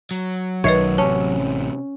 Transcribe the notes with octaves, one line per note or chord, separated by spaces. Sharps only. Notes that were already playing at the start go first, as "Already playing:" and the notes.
F#3
B1 D#3 B4 C#5 D#5 E5
A1 C3 C#4 A5